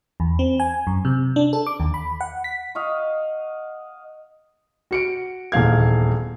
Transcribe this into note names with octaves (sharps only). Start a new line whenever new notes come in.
E2
C4
G#5
F#2
C3
D4
A4
D6
D#2
B5
F#5
B6
D#5 F5 F#5 C#6
F#4 C#7 D7
D#1 E2 F5 G#6